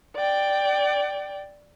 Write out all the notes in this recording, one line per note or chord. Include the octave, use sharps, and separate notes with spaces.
D5 G5